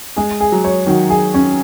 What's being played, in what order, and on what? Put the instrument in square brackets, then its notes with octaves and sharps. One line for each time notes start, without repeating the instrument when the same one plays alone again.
[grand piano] G#3 [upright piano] G#4
[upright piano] G#4
[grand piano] F#3
[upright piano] C#5
[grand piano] D#3 [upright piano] F#3
[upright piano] G#4
C#4